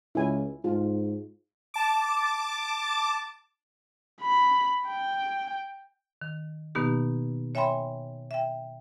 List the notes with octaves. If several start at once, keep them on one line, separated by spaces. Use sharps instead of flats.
C#2 E4 G#5
G#2 F4
A5 D6
B5
G5
D#3
B2 D#3 A#3 B3 D#4 G4
C#5 E5 G5 G#5 B5 C6
E5 G5